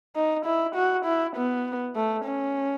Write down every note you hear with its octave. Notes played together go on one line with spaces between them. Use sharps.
D#4
E4
F#4
E4
B3
A3
C#4